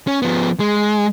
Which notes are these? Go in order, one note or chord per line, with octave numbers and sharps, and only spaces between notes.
C#4
F3 B3
G#3